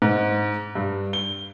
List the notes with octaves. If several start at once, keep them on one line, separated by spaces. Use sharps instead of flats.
G#2
G2
G7